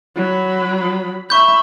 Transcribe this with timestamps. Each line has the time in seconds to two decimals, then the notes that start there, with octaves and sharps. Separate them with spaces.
0.16 F#3 B5
1.30 E5 B5 C#6 G6